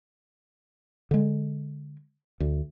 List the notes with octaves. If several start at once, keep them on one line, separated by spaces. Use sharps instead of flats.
D3 G#3
D2